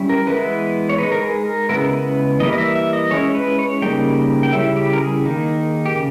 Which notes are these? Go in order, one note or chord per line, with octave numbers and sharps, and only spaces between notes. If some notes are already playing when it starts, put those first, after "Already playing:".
Already playing: G3 C#4 E4
A#4
E3 G#3 B3 E4 B4
C#5
G#3 D#4 B4
A#4
G#4
A#4
C#3 G#3 B3 E4 A#4
B4
E3 G3 A#3 E4 D#5
D#5
E5
E5
D#5
G#3 C#4 E4 C#5
B4
C#5
C#3 G3 A#3 D#4 G5
G5
C#3 G3 C#4 E4 E5
G4
A#4
G#4
D#3 A#3 D#4
G4
C#3